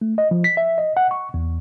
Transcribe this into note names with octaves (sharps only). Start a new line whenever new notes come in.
A3
D#5
F3
B6
E5
D#5
F#5
C#6
E2